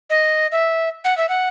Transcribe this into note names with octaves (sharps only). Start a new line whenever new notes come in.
D#5
E5
F#5
E5
F#5